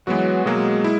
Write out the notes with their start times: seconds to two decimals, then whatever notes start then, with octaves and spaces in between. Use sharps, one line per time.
0.07 E3 F#3 G#3 B3 F#4
0.46 B2 F#3 G#3 A#3
0.84 E4